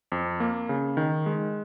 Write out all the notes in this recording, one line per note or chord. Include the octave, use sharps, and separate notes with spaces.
F2
A#3
C#3
D#3
G#3